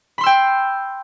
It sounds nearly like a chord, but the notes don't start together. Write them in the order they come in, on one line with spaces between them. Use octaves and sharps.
B5 C6 E6 G5